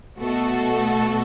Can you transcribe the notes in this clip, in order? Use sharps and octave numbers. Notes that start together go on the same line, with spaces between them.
B2 A3 F#4 A4